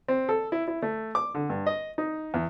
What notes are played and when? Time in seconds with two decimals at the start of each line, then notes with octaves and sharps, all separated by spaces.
0.08 C4
0.29 A4
0.52 E4
0.68 E4
0.82 A3
1.15 D6
1.35 D3
1.50 G2
1.66 D#5
1.98 D#4
2.34 E2